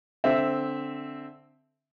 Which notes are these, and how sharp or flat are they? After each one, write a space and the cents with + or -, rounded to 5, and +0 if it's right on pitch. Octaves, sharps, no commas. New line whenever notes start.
D3 -10 C4 +0 E5 +0